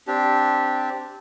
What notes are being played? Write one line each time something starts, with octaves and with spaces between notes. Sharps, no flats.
C4 D4 G4